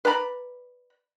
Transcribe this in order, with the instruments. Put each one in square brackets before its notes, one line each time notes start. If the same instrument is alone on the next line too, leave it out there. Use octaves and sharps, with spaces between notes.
[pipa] B4 D5 A#5 B5